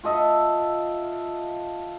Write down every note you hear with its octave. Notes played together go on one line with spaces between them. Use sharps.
F4 A4 D#5 E5